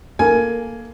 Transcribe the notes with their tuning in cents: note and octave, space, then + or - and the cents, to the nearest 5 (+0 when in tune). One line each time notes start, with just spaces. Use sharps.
A#3 +0 A4 -5 G#5 +10